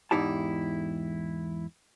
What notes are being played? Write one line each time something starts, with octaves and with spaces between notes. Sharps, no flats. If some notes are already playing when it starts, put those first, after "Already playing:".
E2 G#2 D#4 E4 G4 A5